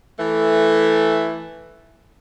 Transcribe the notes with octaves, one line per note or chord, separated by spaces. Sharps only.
E3 A3